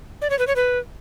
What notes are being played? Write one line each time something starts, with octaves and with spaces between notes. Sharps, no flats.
D5
C#5
B4
C#5
B4